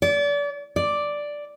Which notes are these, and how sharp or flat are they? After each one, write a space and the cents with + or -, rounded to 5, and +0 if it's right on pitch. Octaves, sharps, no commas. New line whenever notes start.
D5 -35
D5 +0